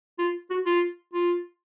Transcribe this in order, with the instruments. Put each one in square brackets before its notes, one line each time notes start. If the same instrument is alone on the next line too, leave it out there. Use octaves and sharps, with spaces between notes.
[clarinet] F4
F#4
F4
F4